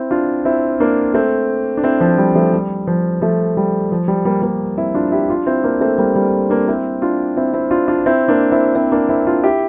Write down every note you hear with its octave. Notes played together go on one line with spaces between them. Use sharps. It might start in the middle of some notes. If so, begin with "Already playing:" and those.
Already playing: C4 E4
D4 F4
C4 E4
A#3 D4
A3 C4
D4
C4 E4
F3
G3
F3 A3
G3
F3
F3 A3
G3
F3
G3
G3 A#3
G3 A#3
C4 E4
D4 F4
E4 G4
D4 F4
C4 E4
A#3 D4
A3 C4
G3 A#3
G3
A#3 D4
C4 E4
D4 F4
C4 E4
C4 E4
D4 F4
D4 F4
C4 E4
A#3 D4
C4 E4
C4 E4
A#3 D4
C4 E4
D4 F4
E4 G4